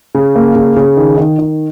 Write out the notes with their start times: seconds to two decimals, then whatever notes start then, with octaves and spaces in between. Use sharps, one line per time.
0.15 C#3
0.35 A#3
0.55 C#3
0.76 C#3
0.97 D#3
1.18 D#3
1.39 D#3